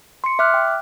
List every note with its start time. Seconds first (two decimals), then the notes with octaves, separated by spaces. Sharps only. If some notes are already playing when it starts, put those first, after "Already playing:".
0.24 C6 C#7
0.39 E5 D6 F6 F#6
0.54 G5